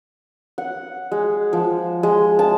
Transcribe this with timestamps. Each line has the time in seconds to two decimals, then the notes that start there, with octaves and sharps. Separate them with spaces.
0.58 F#5
1.12 G#3
1.53 F3
2.03 G#3
2.39 A5